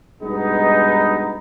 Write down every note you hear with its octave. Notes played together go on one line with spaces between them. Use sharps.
G2 B2 G#3 B3 D#4